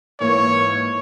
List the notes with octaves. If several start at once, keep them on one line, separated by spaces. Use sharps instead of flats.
G#2 E3 A#3 C#5